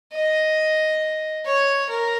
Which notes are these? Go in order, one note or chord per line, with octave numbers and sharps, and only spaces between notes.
D#5
C#5
A#4